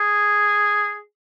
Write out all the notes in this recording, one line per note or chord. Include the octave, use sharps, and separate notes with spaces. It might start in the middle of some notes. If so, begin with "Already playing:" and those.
Already playing: G#4